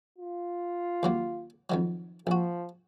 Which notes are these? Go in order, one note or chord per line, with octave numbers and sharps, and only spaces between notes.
F4
D#2 F#3 A#3
F2 D#3 F#3
A#1 F3 F#4